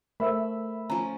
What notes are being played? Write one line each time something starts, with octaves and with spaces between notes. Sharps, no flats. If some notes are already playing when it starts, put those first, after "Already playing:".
A3 A#4 C5 E5 B5 E6
F3 C#4 A#5